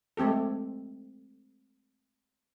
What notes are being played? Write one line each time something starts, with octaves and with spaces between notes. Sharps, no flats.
G#3 A3 C4 G4 A4